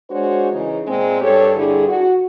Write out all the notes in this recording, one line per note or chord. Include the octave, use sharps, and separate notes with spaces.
G#3 D4 F#4 C5 C#5
C#3 E3 D#4
A#2 G#3 C4
G2 G4 A4 C#5
G2 D3 E4 G#4
F#4